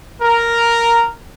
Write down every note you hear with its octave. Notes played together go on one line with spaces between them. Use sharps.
A#4